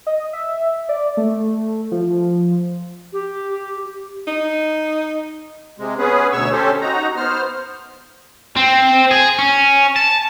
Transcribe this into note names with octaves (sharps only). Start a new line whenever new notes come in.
D#5
E5
D5
A3
F3
G4
D#4
C3 G#3
B3 C#4 G#4 B4
D2 B2 C#5 C#6 E6
C#4 G4 A4 C5
D#4 F#4 A#5
B3 C5 F6
C4
G#4
C#4
A5